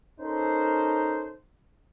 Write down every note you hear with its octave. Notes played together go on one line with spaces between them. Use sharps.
C#4 D#4 A4 A#4 C5